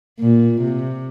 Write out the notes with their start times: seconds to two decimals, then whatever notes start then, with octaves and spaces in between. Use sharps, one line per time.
0.20 A#2
0.61 C3